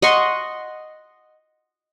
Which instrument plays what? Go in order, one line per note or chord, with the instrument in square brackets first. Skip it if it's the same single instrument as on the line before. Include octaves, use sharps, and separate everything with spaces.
[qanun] D#5 F#5 C6 C#6